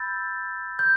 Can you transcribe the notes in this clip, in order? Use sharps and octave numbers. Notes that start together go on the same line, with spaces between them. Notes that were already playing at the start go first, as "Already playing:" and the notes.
Already playing: B5 E6 G6 A6
G6